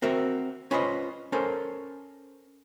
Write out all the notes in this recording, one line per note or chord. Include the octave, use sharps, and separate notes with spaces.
C4 F#4 A#4 E5
C#4 F4 B4 C5 D#5
C#4 A4 A#4 C5